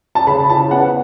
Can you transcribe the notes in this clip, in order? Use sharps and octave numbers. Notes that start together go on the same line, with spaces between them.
A5
C#3 B5
E4 A5
B3 F#5